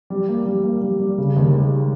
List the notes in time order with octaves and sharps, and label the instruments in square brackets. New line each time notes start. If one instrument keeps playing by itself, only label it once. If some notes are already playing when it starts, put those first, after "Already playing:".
[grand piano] G3
A#3
G3
A#3
G3
G3
C#3
D#2
G#3